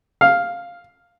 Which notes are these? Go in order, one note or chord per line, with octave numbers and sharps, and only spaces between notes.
F5